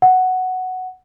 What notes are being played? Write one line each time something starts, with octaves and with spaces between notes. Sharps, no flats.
F#5